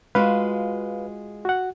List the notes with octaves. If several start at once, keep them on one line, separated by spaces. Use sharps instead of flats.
G#3 F4 F#4 B4 F5
F#4 F#5